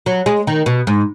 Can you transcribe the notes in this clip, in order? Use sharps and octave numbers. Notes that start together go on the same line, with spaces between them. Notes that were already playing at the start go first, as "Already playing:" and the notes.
F#3
G#3
D#3
B2
G#2